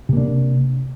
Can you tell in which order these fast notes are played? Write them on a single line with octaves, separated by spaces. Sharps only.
C3 A#3 D4